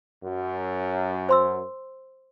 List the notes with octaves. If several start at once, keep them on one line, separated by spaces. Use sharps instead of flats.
F#2
C5 C6 E6